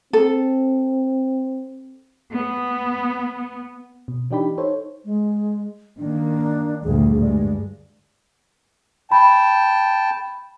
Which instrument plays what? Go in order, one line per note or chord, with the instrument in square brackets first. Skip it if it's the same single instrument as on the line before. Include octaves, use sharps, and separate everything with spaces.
[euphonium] C4 [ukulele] A4
[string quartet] B3
[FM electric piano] B2
E3 D4 D#4 G4 D5 B5
D#4 A4 C5 C#5
[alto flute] G#3
[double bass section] D#3 A#3 [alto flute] D4
[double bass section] D2 G2 A#2 [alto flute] G#4
[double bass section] G2 G#3 [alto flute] D5
[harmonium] G5 A5 [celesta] B5